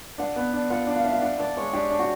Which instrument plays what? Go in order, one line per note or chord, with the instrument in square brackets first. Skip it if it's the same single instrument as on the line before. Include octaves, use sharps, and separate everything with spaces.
[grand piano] D4 [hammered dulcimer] F#5
[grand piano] B3
D4
[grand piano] F4 [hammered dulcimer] F#5
[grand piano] D4
[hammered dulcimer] F5
[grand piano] D4 [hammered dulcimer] E5
[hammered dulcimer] F5
[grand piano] D4 [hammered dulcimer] F#5
[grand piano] D4 [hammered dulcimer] D5
[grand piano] G#3 [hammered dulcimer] C#5
[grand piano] D4 [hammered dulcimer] G4
[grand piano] D4
[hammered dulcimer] F#4